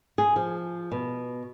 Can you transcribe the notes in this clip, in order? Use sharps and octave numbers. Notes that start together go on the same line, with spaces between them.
G#4
F3
B2